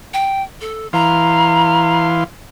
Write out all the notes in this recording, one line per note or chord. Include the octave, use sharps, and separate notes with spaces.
G5
A4
E3 F5 A#5 C6